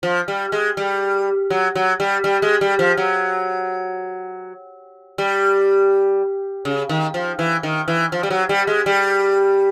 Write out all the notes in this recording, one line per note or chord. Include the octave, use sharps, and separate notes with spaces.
F3
G3
G#3
G3
F#3
F#3
G3
G3
G#3
G3
F3
F#3
G3
C#3
D#3
F3
E3
D#3
E3
F3
G3
F#3
G3
G#3
G3